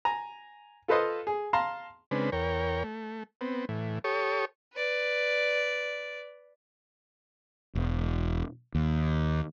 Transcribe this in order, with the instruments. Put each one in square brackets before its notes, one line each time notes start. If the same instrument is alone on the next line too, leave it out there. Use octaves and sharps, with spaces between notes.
[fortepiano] G#5 A#5
F4 A4 B4 C5 D#5 F5
G#4
F5 A5 A#5 C6
[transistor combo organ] C#3 G#3 C4 D4 B4
E2 A#4 C#5 G5
A3
B3 C4
A2 E3
G4 A4 C#5 C#6 D#6
[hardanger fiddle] B4 D5
[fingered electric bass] E1
D#2